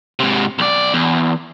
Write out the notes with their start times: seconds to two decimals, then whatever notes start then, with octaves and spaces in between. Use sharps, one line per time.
0.19 G#2 C3
0.59 B1 D5
0.94 E2